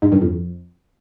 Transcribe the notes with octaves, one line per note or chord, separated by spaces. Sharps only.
G#2
G2
F2